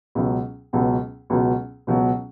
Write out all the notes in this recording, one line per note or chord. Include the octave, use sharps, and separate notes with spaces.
C#2 B2 F#3
C#2 B2 F#3
C#2 B2 F#3
C#2 B2 F#3